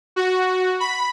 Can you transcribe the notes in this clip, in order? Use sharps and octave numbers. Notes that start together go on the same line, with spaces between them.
F#4
B5